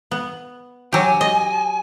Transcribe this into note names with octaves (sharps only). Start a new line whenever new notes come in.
B3
F#3 G4 G#5
D#5